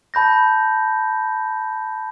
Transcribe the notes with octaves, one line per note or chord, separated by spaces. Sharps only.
A5 B5 G6 A#6